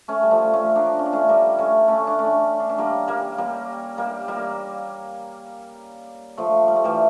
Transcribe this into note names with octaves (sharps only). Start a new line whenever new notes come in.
A3 C#4
G3
F3 A3
A3 C#4
A#3 D4
C#4
D4
A3 C#4
G3 A#3
A3 C#4
A3 C#4
D4
A3 C#4
D4
C#4
G3 A#3
G3 A#3
G3 A#3
G3 A#3
G3 A#3
F3 A3
G3
A3
E3 G3